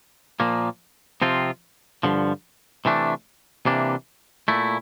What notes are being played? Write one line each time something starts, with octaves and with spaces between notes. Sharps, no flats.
A#2 F3 A#3
C3 F3 C4 F4
G2 D3 F3
C3 E3 A3 D4
C3 E3 A#3 D4
A#2 A3 E4